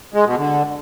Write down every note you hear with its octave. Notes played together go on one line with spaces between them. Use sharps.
G#3
B2
D3